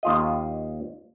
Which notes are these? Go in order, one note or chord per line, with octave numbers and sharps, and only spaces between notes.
D#2 F4 D#5